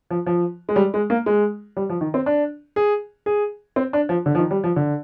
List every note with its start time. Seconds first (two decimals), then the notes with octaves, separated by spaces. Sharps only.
0.10 F3
0.26 F3
0.69 G#3
0.76 G3
0.94 G#3
1.10 A#3
1.26 G#3
1.77 G3
1.90 F3
2.01 D#3
2.14 C4
2.26 D4
2.76 G#4
3.26 G#4
3.76 C4
3.93 D4
4.09 F3
4.26 D3
4.35 F3
4.38 D#3
4.51 G3
4.64 F3
4.76 D3